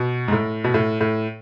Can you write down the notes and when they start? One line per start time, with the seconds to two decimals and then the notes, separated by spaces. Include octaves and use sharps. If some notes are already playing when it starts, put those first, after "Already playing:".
Already playing: B2
0.28 G#2
0.32 A2
0.64 B2
0.74 A2
1.01 A2